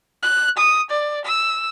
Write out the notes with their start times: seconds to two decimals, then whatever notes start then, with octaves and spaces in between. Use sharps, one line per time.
0.23 F#6
0.58 D#6
0.90 D5
1.25 E6